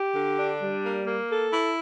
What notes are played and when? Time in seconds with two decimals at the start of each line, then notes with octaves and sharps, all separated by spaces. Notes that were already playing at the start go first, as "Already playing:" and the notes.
Already playing: G4
0.16 D3
0.38 D4
0.61 G3
0.83 A#3
1.07 A#3
1.29 A4
1.51 E4